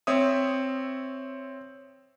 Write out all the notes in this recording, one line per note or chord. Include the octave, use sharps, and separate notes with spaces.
C4 C#5 E5 D#6